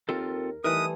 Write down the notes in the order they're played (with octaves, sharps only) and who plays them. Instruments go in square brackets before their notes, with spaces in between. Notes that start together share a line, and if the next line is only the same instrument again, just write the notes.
[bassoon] D#2 [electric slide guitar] C4 F4 A4 [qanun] A#4
[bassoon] D#3 [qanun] E3 G3 A3 [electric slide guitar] A#4 B4 [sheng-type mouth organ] D#6